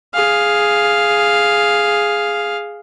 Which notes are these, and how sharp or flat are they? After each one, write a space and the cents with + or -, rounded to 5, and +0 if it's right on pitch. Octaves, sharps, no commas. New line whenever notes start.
G#4 +0 F5 +0